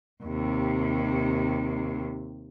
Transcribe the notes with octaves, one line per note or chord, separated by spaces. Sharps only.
D#2 C3